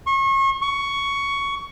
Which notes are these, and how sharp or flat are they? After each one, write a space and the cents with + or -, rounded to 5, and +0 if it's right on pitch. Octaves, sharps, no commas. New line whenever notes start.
C#6 -35
C#6 +10